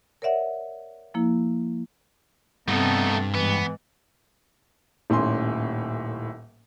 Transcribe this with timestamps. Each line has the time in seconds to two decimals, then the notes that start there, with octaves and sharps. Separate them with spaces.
0.22 A#4 C#5 D5 E5 F#5
1.14 F3 A#3 E4
2.68 G2 C3 A3 B3 D#4 A4
3.35 G#2 E3 B3
5.10 D#1 A2 A#3 C#4 G#5 C6